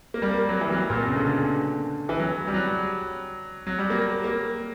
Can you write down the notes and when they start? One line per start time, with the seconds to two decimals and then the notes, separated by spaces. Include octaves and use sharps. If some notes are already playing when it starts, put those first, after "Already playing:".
0.14 A#3
0.22 G3
0.30 A#3
0.49 F#3
0.61 E3
0.72 F#3
0.90 A#2
0.99 B2
1.08 C#3
1.17 D3
2.09 E3
2.19 F#3
2.47 G3
2.54 F#3
3.67 F#3
3.78 G3
3.90 A#3
4.24 A#3